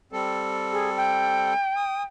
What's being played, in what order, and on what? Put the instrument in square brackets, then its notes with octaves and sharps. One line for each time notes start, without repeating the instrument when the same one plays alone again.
[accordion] G3 C4 A4
[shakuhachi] G#4
G5
[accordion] D#6